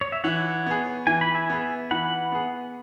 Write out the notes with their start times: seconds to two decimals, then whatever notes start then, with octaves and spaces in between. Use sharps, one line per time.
0.01 C#5
0.12 E5
0.24 E3 C#5 F#5
0.66 B3 G#4
1.07 E3 G#5
1.21 B5
1.35 E5 G#5
1.49 B3 G#4
1.91 E3 F#5 B5
2.32 B3 G#4